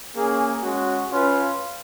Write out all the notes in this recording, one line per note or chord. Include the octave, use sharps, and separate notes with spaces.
A#3 C#4 G#4
G#3 C#4 F#4
C#4 F4 B4 F5